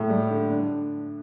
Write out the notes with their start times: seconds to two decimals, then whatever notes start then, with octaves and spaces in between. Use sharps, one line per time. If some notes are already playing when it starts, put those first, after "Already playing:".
Already playing: A2
0.10 G3
0.30 D3
0.50 D4